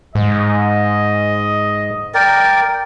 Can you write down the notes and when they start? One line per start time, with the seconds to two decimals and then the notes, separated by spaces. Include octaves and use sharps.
0.15 G#2 D#5
2.14 A#4 D5 G5